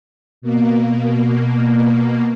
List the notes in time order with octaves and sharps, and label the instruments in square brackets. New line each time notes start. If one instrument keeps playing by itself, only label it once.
[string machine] B2 A#3